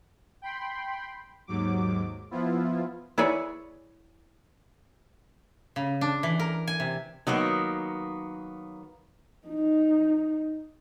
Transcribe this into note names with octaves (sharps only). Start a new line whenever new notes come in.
G5 B5 C6
D#2 G#2 F#3 D6
F3 B3 E4 F4
E4 G#4 B4 C#5 D5
C#3
D4
E3
A#4
G#5
C3
D#3 F#3 A#3 B3
D#4